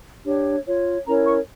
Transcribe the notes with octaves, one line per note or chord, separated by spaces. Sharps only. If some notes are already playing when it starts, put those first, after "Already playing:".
D4 G4 C#5
F4 C#5
C#4 E4 A#4 C#5 A#5
C#6